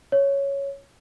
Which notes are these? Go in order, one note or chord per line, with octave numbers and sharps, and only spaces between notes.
C#5